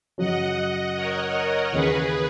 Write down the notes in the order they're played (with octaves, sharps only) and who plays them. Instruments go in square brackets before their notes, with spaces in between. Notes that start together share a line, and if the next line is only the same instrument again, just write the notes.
[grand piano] F#2 C#3 F#3 C#4 F#4 [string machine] D#5 F#5
[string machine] D#5 F#5
A#4 C#5
A#4 C#5
[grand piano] D#2 C#3 E3 [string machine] G#4 B4